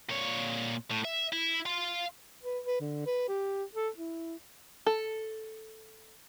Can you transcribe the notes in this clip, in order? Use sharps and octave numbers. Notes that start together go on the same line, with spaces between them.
A#2 C#5
A2
E5
E4
F5 C6
B4
B4
D3
B4
G4
A4
E4
A4